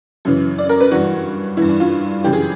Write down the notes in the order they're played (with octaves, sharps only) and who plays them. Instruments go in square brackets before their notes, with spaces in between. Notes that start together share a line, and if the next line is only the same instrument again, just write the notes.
[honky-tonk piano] F#2 C#3 E3
D5
A#4
B4
G2 E3 F#4
G2 E3 E4
D4
F4
F#2 C#3 E3 G4
G#4